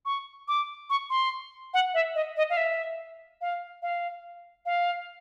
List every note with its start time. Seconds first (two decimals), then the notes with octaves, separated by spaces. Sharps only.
0.06 C#6
0.48 D6
0.90 C#6
1.10 C6
1.74 F#5
1.94 E5
2.15 D#5
2.37 D#5
2.50 F5
2.57 E5
3.41 F5
3.82 F5
4.66 F5